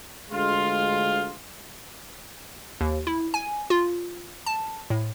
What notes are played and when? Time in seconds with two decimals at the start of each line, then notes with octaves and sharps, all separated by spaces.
0.31 D2 G#3 F4
2.81 D#2
3.07 E4
3.34 G#5
3.70 F4
4.46 A5
4.90 A2